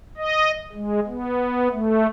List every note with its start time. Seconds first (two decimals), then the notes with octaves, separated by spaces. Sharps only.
0.17 D#5
0.72 G#3
1.07 B3
1.71 A3